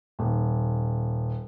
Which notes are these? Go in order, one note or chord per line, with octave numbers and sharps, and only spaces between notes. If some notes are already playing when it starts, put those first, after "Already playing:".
D#1